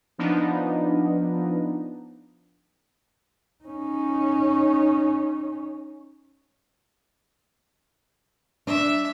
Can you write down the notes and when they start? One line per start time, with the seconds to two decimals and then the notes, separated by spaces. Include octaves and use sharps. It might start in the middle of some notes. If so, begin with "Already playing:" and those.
0.18 F3 B3 D4 D#4
3.64 C#4 D#4
8.67 D4 E5